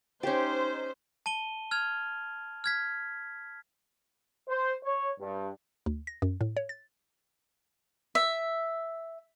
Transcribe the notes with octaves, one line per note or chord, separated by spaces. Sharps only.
C#4 D#4 G4 C5
A5 D#7 G7
F6 G#6 F7
F6 G#6 B6
C5
C#5
G2
D2
A#6
F#2
A2
C#5
A6
E5